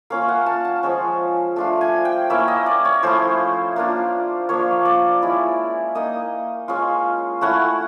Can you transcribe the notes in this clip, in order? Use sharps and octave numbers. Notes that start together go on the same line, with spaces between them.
A#3 C#4 F4 F5
F#5
A5
A5
F3 G#3 C#4
A3 D4 F4 A5
G#5
G5
A#3 C#4 E4 E5
D#5
D5
C#5
F3 A3 C#4 E4 C5
A#3 D4 F4
F3 A#3 D4 C#5
D5
G#3 C#4 E4
A#3 D#4 D#5
G#3 C#4 F4
A3 C#4 E4 F#5